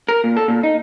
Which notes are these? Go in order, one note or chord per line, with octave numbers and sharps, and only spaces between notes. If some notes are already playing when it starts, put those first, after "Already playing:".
A#4
A#2
A4
A#2
D#4